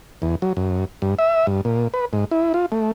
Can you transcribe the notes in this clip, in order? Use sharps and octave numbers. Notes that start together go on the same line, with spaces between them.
E2
F#3
F#2
G2
E5
G2
A#2
B4
G#2
E4
F4
A3